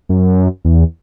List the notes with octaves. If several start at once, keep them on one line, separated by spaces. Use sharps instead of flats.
F#2
E2